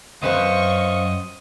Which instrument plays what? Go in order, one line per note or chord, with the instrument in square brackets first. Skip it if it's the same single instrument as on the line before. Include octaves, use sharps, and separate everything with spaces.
[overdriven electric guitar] C#2 F#2 [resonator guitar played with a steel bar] C4 B4 C5 [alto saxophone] D#5 [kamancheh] F5 C#6